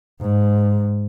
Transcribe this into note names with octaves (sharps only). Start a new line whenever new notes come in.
G#2